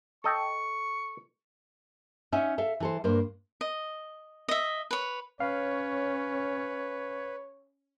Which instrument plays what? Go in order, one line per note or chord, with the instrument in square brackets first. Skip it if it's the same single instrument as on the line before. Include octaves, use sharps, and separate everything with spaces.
[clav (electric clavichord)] A4 D#5 G5 [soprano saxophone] C#6
[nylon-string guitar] C#4 D#4 E5 F#5 G#5
A4 E5 F5
E3 A4 C5
G2 A#3 C5
[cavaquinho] D#5
D#5 E5
B4 C#5
[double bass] C#4 [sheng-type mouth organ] B4 [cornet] C#5 [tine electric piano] F5